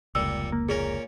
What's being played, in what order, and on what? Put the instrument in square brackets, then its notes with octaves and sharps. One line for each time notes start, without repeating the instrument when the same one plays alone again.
[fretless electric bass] F1 C#2 [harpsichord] A#2 G3 [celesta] E6
[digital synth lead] A#3
[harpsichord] A#2 C#4 A#4 [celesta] G#4